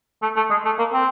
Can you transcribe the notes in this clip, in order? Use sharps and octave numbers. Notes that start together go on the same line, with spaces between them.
A3
A3
G#3
A3
A#3
C4